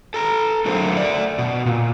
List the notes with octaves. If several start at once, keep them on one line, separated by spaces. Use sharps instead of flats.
A4 A#5
D3 F#3 A3 A4 A#4 C5
A3 D5
B2
A#2